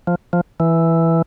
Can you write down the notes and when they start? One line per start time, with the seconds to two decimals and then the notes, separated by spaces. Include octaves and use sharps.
0.07 F3
0.33 F3
0.60 E3